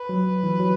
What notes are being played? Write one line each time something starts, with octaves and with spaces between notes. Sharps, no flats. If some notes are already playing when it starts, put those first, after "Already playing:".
Already playing: B4
F#3
E3
F#3